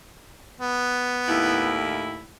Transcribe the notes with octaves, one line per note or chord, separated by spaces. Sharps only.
B3
D#2 A2 E4